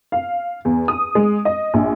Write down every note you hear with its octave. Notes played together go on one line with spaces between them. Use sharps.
F5
E2
D#6
G#3
D#5
A#1